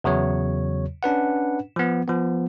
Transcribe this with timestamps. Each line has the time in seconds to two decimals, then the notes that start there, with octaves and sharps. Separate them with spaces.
0.04 E2 C#3 F#3 C#5
1.03 C#4 D4 B4 F#5
1.76 F3 B3
2.08 F3 B3